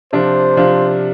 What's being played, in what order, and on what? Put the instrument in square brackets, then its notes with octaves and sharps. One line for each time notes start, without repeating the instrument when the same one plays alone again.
[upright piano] C3 F3 D4 F4 [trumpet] C5
[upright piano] C3 F3 D4 F4